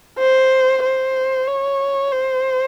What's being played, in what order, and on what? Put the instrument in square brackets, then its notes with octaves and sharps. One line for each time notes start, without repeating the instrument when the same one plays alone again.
[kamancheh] C5
C5
C#5
C5